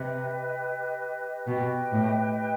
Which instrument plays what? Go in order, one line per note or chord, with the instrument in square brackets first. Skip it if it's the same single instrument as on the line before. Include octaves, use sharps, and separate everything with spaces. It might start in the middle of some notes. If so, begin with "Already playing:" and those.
Already playing: [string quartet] C3 [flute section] G4 B4 D#5
[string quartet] B2 [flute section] G4 B4 D#5 G5
[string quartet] A2